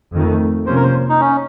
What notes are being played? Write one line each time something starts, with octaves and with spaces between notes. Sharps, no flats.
F2 D#3 A3
C3 F3 A#3 C#4 C5
A#4
C5
D#4
C#4